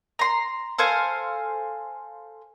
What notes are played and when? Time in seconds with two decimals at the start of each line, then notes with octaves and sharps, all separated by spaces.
0.19 A#5 C6
0.78 A4 C5 F5 G#5